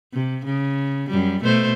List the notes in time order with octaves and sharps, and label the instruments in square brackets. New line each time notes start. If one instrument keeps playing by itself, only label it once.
[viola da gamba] C3
C#3
F#2 G3
B2 A3 C5